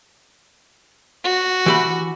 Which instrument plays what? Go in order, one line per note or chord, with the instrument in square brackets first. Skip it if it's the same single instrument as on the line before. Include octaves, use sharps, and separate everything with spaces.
[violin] F#4
[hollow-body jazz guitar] E3 G4 B5